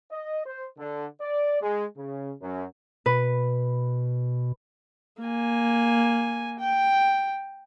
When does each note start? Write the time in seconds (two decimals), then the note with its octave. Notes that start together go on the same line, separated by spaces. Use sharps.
0.11 D#5
0.45 C5
0.77 D3
1.21 D5
1.61 G#3
1.97 C#3
2.41 F#2
3.06 B2 B4
5.22 A#3 G#5
6.60 G5